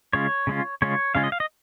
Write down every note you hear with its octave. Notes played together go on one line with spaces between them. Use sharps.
C#3 G#3 C#4 F4 C#5
C#3 G#3 C#4 F4
C#3 G#3 C#4 F4 C#5
C#3 G#3 C#4 F4 F5
D#5
F5
D#5